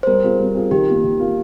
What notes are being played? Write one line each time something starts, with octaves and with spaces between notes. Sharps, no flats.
C5
G3 A#4
C4 F4 G#4
G3
C4 F4 G#4
D#3 G4
A#3 F4
D#3
A#3 F4